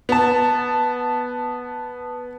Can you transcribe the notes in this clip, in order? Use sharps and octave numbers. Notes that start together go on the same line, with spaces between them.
B3 A5